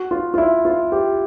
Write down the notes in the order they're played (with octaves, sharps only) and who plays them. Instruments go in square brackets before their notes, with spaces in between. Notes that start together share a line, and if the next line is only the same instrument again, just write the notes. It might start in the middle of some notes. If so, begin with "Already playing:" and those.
Already playing: [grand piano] F#4
F4
F4
E4
F4
G4